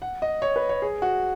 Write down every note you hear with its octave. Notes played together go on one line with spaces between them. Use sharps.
F#5
D#5
C#5
B4
C#5
G#4
F#4